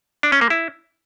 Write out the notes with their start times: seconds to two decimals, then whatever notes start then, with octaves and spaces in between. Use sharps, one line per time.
0.23 D4
0.32 C#4
0.41 A#3
0.50 E4